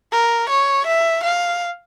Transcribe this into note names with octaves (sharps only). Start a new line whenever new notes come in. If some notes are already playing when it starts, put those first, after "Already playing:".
A#4
C#5
E5
F5